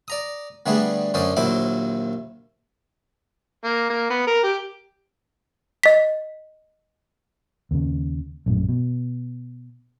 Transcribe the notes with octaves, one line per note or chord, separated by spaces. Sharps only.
D5 A#5 D#6
D3 G3 A3 B3 D4 G#4
F#2 D3 C#4 C5 D5 D#6
A#1 D#2 F#3 E4 C5 D6
A#3
A#3
B3
A#4
G4
D#5 B6
D#2 C#3
A#1 F#2 A2
B2